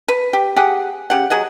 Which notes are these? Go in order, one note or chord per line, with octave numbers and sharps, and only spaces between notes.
B4
G4
G4 G#4 F#5
C#3 G4 F#5
F#3 G#4 D#5 F#5